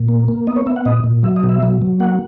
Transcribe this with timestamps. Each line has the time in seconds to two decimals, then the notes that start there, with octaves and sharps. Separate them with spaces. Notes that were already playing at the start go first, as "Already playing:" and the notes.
Already playing: A#2
0.08 A#3
0.28 A#3
0.47 B3 D#5
0.56 C#5
0.66 B3 E5
0.76 F#5
0.85 A#2 D#5
1.04 A#2
1.23 F#3 E5
1.36 D#5
1.43 B2
1.49 E5
1.63 F#3
1.82 F#3
2.00 A#3 F#5